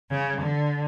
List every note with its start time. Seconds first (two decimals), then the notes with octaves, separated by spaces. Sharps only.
0.10 C#3
0.41 D3